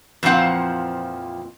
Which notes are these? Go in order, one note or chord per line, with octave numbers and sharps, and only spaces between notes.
F2 A#2 E3 F3 C4 F#5